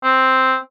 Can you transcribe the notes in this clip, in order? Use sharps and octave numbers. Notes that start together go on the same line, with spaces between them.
C4